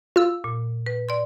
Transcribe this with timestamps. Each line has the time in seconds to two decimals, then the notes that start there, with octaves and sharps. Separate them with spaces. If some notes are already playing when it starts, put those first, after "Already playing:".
0.16 F4 F5 E6
0.44 A#2
0.86 B4
1.09 D5 C6